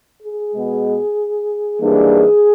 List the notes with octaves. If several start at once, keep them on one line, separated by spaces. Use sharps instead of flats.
G#4
B2 G#3 B3
G#2 E3 G3 A#3 D4 G#4